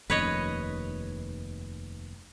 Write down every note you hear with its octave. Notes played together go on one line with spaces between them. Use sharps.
F1 D#2 C#4 B4 C#5 D#5